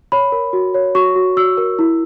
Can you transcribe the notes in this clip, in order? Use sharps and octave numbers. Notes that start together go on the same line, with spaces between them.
C#5 B5
A#4
F#4
C#5
F#4 C#6
F#4
F#4 E6
A#4
E4